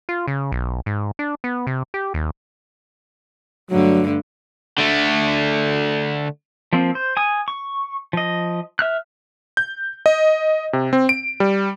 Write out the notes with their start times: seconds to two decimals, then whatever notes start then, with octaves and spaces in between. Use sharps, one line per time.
0.09 F4
0.27 C#3
0.52 B1
0.86 G#2
1.19 D4
1.44 B3
1.67 C3
1.94 G4
2.14 D#2
3.70 G2 D3 F#3 A3
4.78 D3 A3
6.73 F3 A#3 C4
6.95 C5
7.17 G#5 D#6
7.48 C#6
8.13 F3 D#5
8.79 E5 F6 F#6
9.57 G6
10.06 D#5
10.73 C3
10.93 C4
11.09 D7
11.40 G3